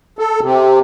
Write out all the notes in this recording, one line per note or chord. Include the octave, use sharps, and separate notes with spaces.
A4
C3